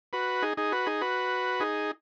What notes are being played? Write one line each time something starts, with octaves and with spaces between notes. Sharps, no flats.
F#4 B4
D#4 G#4
D#4 G#4
F#4 B4
D#4 G#4
F#4 B4
D#4 G#4